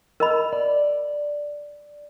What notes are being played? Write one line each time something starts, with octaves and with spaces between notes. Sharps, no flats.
A#4 D#5 B5
D5